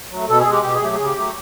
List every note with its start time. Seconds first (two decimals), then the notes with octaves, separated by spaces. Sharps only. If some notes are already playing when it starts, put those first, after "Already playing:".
0.11 F#3 A3
0.28 B2 A4
0.40 G#4
0.46 G#3
0.52 G4
0.63 B2 G4
0.74 G#4
0.82 F#3 A3 G4
0.95 C#3 G#4
1.06 G4
1.17 F#3 A3